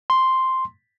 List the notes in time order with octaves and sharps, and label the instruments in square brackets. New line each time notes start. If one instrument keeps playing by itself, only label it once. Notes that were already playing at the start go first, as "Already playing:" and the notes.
[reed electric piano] C6